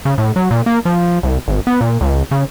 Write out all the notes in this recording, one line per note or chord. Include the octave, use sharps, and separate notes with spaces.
C#3
A2
F#3
A#2
A#3
F3
C2
G#1
B3
A#2
C#2
C#3